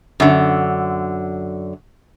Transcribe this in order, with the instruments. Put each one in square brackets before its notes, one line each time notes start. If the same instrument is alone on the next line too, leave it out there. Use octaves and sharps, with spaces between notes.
[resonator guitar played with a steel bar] F#2 D3